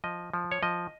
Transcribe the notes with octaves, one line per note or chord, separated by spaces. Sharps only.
F3 D#5
F3
C#5
F3 D#5